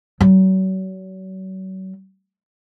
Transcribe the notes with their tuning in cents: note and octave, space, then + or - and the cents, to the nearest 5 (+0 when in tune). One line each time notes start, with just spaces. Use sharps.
F#3 +35